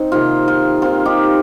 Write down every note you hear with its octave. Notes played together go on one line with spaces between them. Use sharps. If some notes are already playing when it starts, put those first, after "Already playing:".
Already playing: C4 D#4
C3 D#3 A#3 F4
F4
D#3 C4 F4
D#4 G4